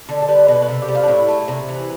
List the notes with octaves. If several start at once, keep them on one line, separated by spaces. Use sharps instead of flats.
D3
A4
G3 B4
B2 B4
B4
C3 A4
G4
G3
F4
D4
A2 E4
A3
C3 E4
E3